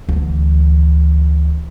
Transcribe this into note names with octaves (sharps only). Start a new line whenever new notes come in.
D2 E3